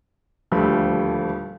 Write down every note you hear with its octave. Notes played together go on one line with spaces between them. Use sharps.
D#1 D2 F3 G3 A3 B5